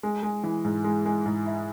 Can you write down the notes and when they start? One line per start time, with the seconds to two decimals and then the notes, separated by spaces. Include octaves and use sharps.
0.03 G#3
0.23 G#3
0.44 E3
0.65 G#2
0.84 G#3
1.06 G#3
1.26 G#2
1.46 E4